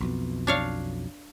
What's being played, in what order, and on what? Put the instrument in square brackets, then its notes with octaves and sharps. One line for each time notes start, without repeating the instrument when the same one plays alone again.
[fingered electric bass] B1 F2 B2
[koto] D4 C#5 F5